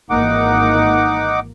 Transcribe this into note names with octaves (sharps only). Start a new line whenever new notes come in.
G#1 E3 A#3 D#4 F#5 D6